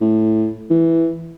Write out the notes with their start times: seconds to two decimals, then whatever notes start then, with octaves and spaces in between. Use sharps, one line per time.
0.01 A2
0.70 E3